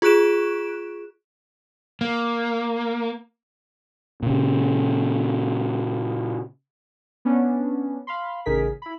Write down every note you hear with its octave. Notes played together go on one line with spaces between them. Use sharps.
F4 G#4 C#6 F#6 D7 E7
A#3
A#2 C#3
B3 C#4 D4
F5 B5 C6
A1 C#3 D#4 G#4 A#4 B6
E4 B5